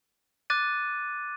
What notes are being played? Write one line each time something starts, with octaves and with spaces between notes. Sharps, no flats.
D6 F#6 A6 D#7